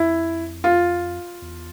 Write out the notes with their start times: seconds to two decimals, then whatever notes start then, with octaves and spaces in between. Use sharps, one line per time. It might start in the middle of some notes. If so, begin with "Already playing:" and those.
Already playing: F2 E4
0.64 F4
1.42 E2